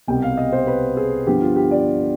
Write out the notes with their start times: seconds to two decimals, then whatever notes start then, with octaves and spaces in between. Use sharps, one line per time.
0.08 C2 B2 G3 B3 G5
0.22 F5
0.37 D#5
0.52 C5
0.67 B4
0.97 G#4
1.26 G2 D3 F3 B3 G4
1.41 F4
1.56 G4
1.71 D5